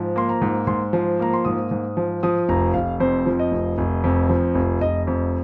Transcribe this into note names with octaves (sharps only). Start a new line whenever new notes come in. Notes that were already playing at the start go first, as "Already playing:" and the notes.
Already playing: G#2 F3
A#3 C6
A#5
G#2
G#2 C6
F3
A#3 A#5
C6
G#2 D#6
G#2
F3
F3 D#6
F1 A#5
F1 F5
F2 C5
F3
D#5
F1
F1
F2
F3
F1
F1 D#5
F2